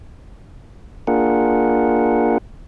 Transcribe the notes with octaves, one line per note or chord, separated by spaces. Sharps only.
A#3 D4 F4 G#4 A#4 F#5